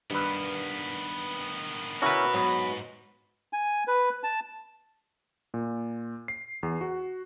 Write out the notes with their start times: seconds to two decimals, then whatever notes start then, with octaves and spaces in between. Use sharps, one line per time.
0.11 G2 D#3 B3 B4
2.02 C#4 E4 F#4 A#4 B4
2.34 G#2 F#3 B3
3.53 G#5
3.88 B4
4.23 A5
5.54 A#2
6.28 C7
6.63 E2
6.81 F#4